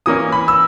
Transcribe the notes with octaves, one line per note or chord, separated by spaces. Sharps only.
E3 A#3 C#4 D#6
B5
E6